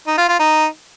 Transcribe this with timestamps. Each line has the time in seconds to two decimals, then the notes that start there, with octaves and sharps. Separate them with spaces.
0.07 D#4
0.18 F4
0.29 F4
0.39 D#4